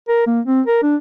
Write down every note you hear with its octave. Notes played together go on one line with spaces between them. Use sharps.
A#4
A#3
C4
A#4
D4